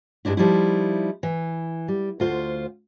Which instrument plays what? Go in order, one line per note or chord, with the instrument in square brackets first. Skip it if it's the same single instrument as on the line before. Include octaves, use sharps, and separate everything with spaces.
[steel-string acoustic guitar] G2 G#3 D4 E4
F3 G3 D#4 E4
E3
G3
D2 F4 C5